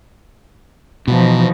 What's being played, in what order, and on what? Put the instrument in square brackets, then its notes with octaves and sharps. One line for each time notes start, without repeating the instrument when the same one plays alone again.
[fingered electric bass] B2 [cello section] E3 F3 D#4